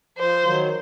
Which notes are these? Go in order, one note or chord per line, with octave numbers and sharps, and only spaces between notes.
F3 C5
D#3 F#3